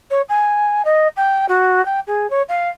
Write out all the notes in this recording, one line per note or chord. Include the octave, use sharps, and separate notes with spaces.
C#5
G#5
D#5
G5
F#4
G5
G#4
C#5
F5